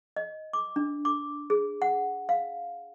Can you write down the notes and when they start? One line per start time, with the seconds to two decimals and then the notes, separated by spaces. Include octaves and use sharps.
0.17 D#5
0.53 D6
0.76 D4
1.05 D6
1.50 G#4
1.82 F#5
2.29 F5